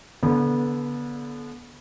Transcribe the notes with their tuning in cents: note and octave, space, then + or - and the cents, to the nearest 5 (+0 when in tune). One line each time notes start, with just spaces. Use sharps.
D3 -35 B3 -25